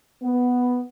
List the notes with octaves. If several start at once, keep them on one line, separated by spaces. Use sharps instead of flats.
B3